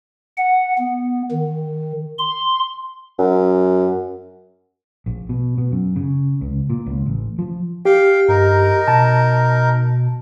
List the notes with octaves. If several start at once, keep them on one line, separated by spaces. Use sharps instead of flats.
F#5
B3
D#3
C6
F#2
A#1
B2
B2
F#2
C#3
C#2
A#2
C#2
A1
F3
G4 F5 G5
G2 D#4 A#4
B2 A5